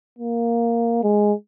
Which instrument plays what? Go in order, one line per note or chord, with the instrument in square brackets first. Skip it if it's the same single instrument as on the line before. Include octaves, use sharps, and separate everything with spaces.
[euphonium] A#3
G#3